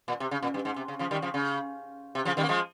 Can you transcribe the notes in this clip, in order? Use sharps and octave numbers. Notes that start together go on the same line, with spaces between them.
A#2
C3
C#3
A#2
G2
G#2
C3
C#3
C#3 F3
D#3 G3
C#3 F3
C#3
C3
C#3 F3
D#3 G3
A#3
F3 G#3